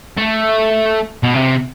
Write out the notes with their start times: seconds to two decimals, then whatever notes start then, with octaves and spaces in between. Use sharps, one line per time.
0.18 A3
1.23 B2
1.34 C3